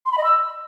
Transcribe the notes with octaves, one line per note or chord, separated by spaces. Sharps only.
C6
B5
D#5
E6